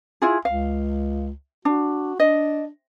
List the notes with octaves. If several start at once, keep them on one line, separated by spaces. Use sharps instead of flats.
E4 F4 G#4
C#2 F5
D4 F#4
D4 D#5